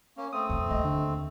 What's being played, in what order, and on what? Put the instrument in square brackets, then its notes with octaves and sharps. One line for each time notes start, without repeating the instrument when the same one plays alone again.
[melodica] A#3 C#4
[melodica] A3 C4 [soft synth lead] D#6
[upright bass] F2
[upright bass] D#2 [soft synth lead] D#5
[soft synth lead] D3